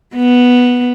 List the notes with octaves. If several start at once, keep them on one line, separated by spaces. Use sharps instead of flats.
B3